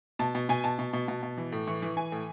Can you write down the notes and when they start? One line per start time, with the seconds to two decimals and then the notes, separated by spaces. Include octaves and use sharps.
0.19 B2 A5
0.35 B2
0.49 B2 G#5
0.64 B2 A5
0.79 B2
0.93 B2
1.08 B2
1.23 B2
1.38 E3
1.52 A2
1.67 E3 C#6
1.82 E3
1.96 E3 G#5
2.12 A2